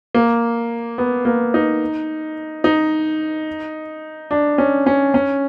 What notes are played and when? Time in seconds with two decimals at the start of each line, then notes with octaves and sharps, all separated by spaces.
0.15 A#3
0.98 B3
1.25 A#3
1.54 D#4
2.64 D#4
4.31 D4
4.58 C#4
4.86 C#4
5.14 C#4